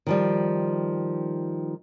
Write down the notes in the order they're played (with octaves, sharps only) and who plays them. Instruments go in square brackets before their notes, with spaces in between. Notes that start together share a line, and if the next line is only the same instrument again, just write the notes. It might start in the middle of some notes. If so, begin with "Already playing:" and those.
[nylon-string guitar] D#3 F3 G3